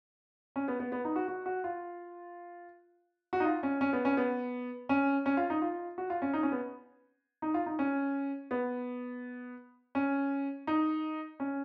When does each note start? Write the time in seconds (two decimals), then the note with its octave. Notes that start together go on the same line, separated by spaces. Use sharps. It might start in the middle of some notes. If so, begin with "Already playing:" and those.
0.56 C#4
0.68 B3
0.80 B3
0.92 B3
1.05 D#4
1.16 F#4
1.28 F#4
1.46 F#4
1.64 F4
3.33 F#4
3.40 D#4
3.45 F4
3.63 C#4
3.81 C#4
3.93 B3
4.05 C#4
4.17 B3
4.89 C#4
5.26 C#4
5.37 F4
5.50 D#4
5.62 F4
5.98 F#4
6.10 F4
6.22 C#4
6.33 D#4
6.43 C#4
6.52 B3
7.42 D#4
7.54 F4
7.66 D#4
7.79 C#4
8.51 B3
9.95 C#4
10.67 D#4
11.40 C#4